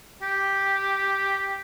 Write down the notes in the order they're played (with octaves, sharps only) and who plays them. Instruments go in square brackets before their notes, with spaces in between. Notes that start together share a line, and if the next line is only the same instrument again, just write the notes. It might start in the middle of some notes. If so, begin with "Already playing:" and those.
[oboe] G4